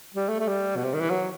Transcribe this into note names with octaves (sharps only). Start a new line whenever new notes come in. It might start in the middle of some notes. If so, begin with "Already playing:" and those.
G3
A3
A3
G3
B2
C3
D#3
E3
F#3